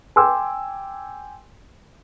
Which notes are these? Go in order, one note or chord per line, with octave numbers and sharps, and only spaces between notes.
G5 G#5 C6 D6 E6